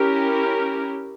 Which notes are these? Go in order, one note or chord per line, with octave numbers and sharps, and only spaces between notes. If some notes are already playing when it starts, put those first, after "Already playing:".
Already playing: C#4 E4 G4 A#4